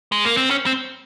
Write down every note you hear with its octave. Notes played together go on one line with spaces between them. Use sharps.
G#3
A#3
C4
C#4
C4